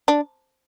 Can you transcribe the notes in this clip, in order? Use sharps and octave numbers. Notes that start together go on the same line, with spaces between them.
D4